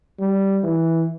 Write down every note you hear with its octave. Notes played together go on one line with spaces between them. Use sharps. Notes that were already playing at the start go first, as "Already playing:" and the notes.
G3
E3